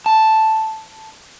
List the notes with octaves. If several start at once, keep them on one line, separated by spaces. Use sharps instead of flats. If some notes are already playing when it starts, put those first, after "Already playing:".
A5